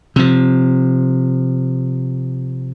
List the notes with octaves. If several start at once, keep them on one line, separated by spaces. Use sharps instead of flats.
C3 F3